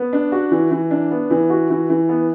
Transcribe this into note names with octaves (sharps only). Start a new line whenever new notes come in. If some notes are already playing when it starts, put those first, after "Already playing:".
Already playing: B3
D4
F#4
E3
E3
D4
B3
E3
F#4
E3
E3
B3